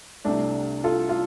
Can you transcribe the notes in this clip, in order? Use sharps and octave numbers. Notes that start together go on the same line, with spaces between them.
C2 C3 A3 D4
F4 A4
F4